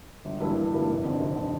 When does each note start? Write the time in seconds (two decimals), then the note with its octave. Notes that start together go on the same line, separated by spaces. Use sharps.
0.25 G1
0.40 G2 E3 A#3 E4
0.57 G1
0.73 G2 E3 A#3 E4
0.89 F1
1.04 F2 D3
1.20 F1
1.36 D3